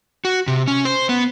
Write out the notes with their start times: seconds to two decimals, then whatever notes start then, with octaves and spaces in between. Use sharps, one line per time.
0.25 F#4
0.47 C3
0.67 C#4
0.85 C5
1.09 B3